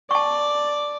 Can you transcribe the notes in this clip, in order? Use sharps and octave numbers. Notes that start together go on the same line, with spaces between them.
D5 A5 C#6